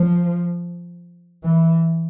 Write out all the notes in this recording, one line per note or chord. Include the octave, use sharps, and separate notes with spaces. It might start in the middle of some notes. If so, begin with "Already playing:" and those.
Already playing: F3
E3